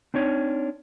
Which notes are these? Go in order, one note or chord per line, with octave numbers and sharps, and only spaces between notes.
C4 D4 D#4 C#5